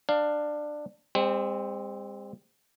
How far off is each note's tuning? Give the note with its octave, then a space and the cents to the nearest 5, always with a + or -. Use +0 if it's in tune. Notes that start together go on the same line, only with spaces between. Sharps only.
D4 +15 F5 +0
G#3 -45 C4 +0